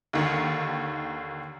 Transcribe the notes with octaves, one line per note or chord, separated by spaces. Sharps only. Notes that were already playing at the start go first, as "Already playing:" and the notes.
D#2 D3 D#3